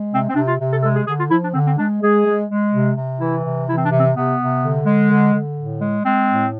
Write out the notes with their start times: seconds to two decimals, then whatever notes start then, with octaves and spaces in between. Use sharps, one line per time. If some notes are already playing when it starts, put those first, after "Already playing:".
Already playing: G#3
0.12 C3 C4
0.29 C4
0.35 C3 D4
0.47 F4
0.59 C3
0.72 A4
0.83 G#3 A4
0.96 G#4
1.08 D3 G#4
1.19 F4
1.31 F3 E4
1.43 D4
1.54 D3 C4
1.67 C4
1.78 G#3 D4
2.02 G#3 G#4
2.25 G#3
2.50 G#3
2.73 C3
2.97 C3
3.20 E3 E4
3.44 C3
3.68 E3 E4
3.77 C4
3.84 D4
3.91 C3
4.00 C4
4.15 C3 B3
4.39 C3
4.62 D3
4.86 G#3
5.10 D3
5.34 D3
5.57 A2
5.81 G#3
6.05 G#3 C4
6.28 A2